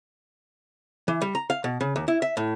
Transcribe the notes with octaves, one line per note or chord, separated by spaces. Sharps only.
E3
G3
A#5
F5
B2
C#3
D#2
E4
E5
A2